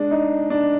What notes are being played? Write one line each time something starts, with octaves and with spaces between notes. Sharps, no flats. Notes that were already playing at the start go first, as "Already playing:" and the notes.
Already playing: G#3 D4
D#4
D4